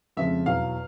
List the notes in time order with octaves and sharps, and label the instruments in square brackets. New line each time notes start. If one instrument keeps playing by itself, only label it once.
[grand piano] F2 C#3 F3 G#3 [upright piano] E5
[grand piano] E2 B2 F#3 [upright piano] F5